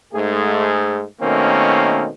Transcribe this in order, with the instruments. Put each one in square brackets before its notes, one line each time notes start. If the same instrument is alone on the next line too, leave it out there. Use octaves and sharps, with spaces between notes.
[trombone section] G#2 A3 G#4
B2 D#3 A3 A#3 C4 C#4